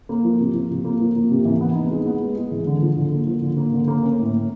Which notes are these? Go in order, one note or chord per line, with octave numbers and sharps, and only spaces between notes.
A#3
F3
C3
F3
C3
A#3
F3
A#3
C3
E3
B3
D#4
G#3
B3
G#3
G#3
E3
D3
F3
D3
A#3
F3
D3
A#3
D3
A#3
C#4
A2
A2